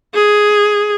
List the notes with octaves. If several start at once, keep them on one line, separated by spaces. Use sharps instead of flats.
G#4